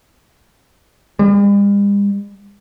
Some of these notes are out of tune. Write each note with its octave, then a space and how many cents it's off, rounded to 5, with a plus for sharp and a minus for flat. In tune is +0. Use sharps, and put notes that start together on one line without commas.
G3 +45